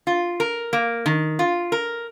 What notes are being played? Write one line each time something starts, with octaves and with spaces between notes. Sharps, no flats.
F4
A#4
A#3
D#3
F4
A#4